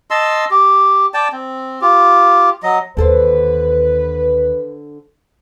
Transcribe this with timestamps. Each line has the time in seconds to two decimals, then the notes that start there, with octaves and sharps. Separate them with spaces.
0.10 D#5 A5 C6 E6
0.51 G4
1.14 D5 G5 A5
1.32 C4
1.82 F4 G4
2.63 F#3 D#5
2.97 D#2 D3 A4 B4 C5